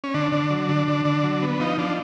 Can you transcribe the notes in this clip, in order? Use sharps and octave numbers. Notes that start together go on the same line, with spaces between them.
C#4
D3 D4
D3
F#3
D3
D3
D3
F#3
B3
F3 D#4
F3 D4